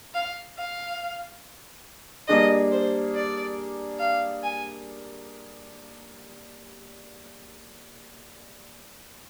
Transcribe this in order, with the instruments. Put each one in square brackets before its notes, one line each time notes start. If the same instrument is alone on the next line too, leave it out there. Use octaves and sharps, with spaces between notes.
[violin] F5
F5
[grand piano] G3 A#3 D4 G#4 [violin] D#5
[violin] C5
D5
F5
G#5